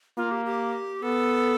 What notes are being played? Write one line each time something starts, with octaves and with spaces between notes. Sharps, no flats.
A#3 F4
G4
G4
B3 A4